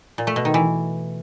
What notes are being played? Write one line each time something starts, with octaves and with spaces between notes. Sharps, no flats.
A#2
A3
B2
D#3
E3